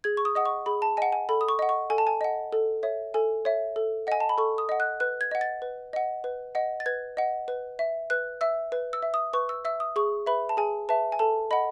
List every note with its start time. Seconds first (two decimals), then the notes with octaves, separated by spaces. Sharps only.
0.04 G#4 G#6
0.17 C#6
0.25 D#6
0.35 D#5 F#5 D#6
0.45 C#6
0.66 G#4 B5
0.82 A5
0.97 D#5 F#5 G#5
1.12 G#5
1.29 A4 B5
1.41 D#6
1.49 C#6
1.59 D#5 F#5
1.69 C#6
1.90 A4 G#5
1.98 A5
2.07 G#5
2.21 D#5 F#5
2.52 A4
2.83 C#5 E5
3.14 A4 G#5
3.45 C#5 E5
3.76 A4
4.07 D#5 F#5 G#5
4.20 A5
4.29 B5
4.38 A4 C#6
4.58 D#6
4.69 D#5 F#5
4.80 F#6
5.00 B4 F#6
5.21 G#6
5.31 D#5 F#5
5.41 A6
5.62 B4
5.93 D#5 F#5
6.24 B4
6.55 D#5 F#5
6.80 A6
6.86 B4 G#6
7.17 D#5 F#5
7.48 B4
7.79 E5
8.10 B4 F#6
8.41 E5 E6
8.72 B4
8.93 E6
9.03 E5
9.14 D#6
9.33 B4 C#6
9.49 E6
9.65 E5 E6
9.80 D#6
9.96 G#4 C#6
10.26 B4 E5 B5
10.49 A5
10.57 G#4 G#5
10.89 B4 E5 A5
11.12 G#5
11.19 A4 A5
11.51 D#5 F#5 B5